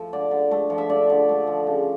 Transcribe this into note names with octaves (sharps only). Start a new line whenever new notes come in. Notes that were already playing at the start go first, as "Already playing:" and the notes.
Already playing: F3 A3 A4
D3 D5
D3
A3
F3
E5
D3 D5
D3
A3
F3
C#3